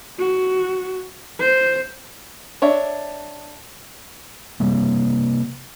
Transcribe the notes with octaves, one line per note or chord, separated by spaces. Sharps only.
F#4
C5
D4 C#5 E5
C3 G3 A#3